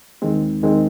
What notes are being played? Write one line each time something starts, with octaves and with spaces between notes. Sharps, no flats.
D#2 D#3 G#3 C4
D#2 D#3 G#3 C4